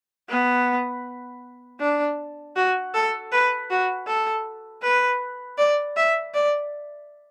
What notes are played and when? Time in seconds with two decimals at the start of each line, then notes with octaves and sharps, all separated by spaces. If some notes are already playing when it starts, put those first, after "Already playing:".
0.29 B3
1.80 D4
2.56 F#4
2.94 A4
3.32 B4
3.70 F#4
4.07 A4
4.83 B4
5.58 D5
5.97 E5
6.34 D5